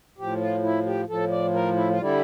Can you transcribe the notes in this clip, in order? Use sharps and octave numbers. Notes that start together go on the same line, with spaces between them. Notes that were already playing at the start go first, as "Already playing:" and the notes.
A2 F3 G4
F4
E4
G4
A2 F3 A4
D5
A#4
E4
F4
D3 G3 E4